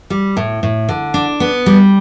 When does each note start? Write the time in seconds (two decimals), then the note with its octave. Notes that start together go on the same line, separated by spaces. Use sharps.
0.10 G3
0.37 A2
0.63 A2
0.89 D3
1.14 D4
1.40 B3
1.66 G3